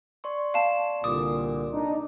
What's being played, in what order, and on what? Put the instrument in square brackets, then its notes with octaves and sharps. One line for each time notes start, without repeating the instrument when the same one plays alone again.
[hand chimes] D5 C6 C#6
[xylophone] F5 A5
[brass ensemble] C2 A#2 D3 [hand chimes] D6 [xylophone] D#6
[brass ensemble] D4 D#4